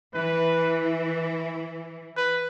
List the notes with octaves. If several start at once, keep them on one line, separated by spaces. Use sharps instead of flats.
E3 B4
B4